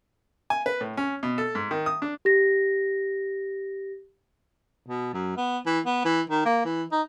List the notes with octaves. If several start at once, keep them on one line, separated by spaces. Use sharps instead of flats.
G#5
B4
A2
C#4
B2
A4
G#2
D#3
D#6
D4
G4 A#6
B2
F#2
B3
E3
B3
E3
D#3
A#3
E3
D#4